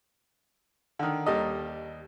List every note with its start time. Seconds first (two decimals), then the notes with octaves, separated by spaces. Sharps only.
0.99 D3 D#3
1.26 D#2 G3 A4 D#5 A#5